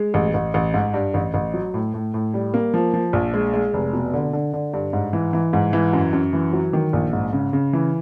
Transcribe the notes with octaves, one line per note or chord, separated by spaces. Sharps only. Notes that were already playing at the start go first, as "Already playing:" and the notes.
Already playing: G#3
A1
A1
A1
G#2
G2
A1
A1
F#3
A2
A2
A2
G3
A#3
F3
F3
A#1
G#3
G#3
F1
B2
D3
D3
D3
G2
G#2
E3
E3
G#2
E3
F#2
F#2
E3
F#3
D#3
A#1
G#2
C#3
C#3
E3